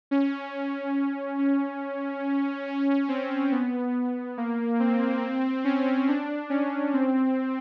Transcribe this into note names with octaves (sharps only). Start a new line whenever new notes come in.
C#4
C#4
C#4
C4
B3
A#3
C4
C#4
D4
C#4
C4